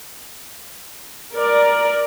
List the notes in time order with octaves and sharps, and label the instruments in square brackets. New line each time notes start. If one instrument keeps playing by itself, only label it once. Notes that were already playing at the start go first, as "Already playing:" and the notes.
[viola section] A#4 D5